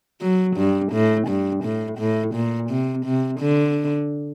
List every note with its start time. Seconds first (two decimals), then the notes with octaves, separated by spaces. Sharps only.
0.21 F#3
0.57 G2
0.92 A2
1.28 G2
1.64 A2
1.99 A2
2.35 A#2
2.70 C3
3.06 C3
3.40 D3